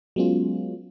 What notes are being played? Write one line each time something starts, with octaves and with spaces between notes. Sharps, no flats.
F#3 G#3 B3 C#4 F4